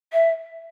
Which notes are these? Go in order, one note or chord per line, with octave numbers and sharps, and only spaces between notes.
E5